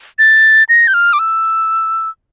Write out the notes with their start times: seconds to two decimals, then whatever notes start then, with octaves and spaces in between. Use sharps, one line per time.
0.19 A6
0.69 A#6
0.88 G6
0.94 F6
1.13 D6
1.19 E6